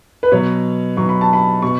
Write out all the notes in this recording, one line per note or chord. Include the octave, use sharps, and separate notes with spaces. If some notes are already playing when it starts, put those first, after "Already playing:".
B4
B2 F#3 C#5
B2 F#3 C#6
B5
A5
B5
B2 C#6